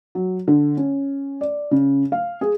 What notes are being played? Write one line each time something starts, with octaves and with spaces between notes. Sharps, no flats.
F#3
D3
C#4
D5
C#3
F5
G#4